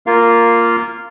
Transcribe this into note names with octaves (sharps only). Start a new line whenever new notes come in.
A#3 F4 A#4 F5